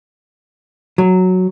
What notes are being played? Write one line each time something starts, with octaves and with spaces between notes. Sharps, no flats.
F#3